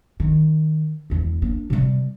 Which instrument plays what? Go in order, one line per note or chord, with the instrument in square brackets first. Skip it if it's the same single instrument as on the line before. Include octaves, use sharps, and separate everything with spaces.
[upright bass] D#3
E1 E2
A#3 D4
C3 G3